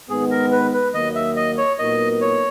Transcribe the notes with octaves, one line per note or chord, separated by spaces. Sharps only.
G#2 D#3 G#3 B3 G#4
A#4
B4
B4
D#2 D#3 F#3 A#3 D#5
E5
D#5
C#5
A#2 F#3 B3 D#4 A#4 D#5
C#5